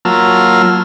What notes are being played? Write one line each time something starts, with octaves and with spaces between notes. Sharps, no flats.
F#3 A#3 F4 A5 E6 F6